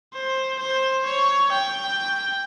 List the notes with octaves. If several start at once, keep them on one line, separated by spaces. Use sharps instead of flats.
C5
C5
C#5
G5